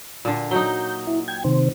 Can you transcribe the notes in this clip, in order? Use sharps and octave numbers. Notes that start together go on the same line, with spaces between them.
A#2 D3
F#3 D#4 G6
E4
G5 G#6
C3 D#3 C5